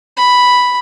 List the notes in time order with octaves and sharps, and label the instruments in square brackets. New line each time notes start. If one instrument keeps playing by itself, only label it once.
[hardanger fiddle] B5